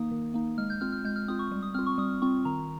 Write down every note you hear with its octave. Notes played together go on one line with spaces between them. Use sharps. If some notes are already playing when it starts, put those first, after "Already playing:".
Already playing: D#3 A#3 D#4 D#6
D#3
A#3 D#4
G#3 F6
G6
C4 F4 F6
F6
G#3 G6
F6
C4 F4 D#6
C#6
G3
D#6
C4 F4 F6
C#6
G3 D#6
C4 F4 C#6
D#3 A#5